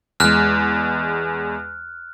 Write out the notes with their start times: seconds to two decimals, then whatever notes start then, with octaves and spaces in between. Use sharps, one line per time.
0.20 E2 G#3 F6 F#6